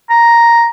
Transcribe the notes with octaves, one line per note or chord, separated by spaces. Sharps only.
A#5